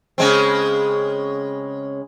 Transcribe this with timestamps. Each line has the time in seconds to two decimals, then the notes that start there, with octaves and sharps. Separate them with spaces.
0.18 C#3 G#3 C4